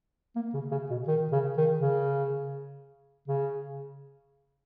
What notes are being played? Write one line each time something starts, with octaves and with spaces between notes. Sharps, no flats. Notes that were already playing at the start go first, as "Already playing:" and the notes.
A#3
C#3
C#3
B2
D#3
C#3
D#3
C#3
C#3